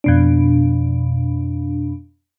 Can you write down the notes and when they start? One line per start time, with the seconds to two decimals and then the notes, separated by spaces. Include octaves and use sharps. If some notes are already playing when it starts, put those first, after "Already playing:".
0.04 F2 B2 D4